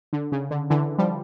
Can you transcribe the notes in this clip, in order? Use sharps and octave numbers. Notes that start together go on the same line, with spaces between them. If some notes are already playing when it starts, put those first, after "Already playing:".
D3
C#3
D3
D3 E3
F3 G3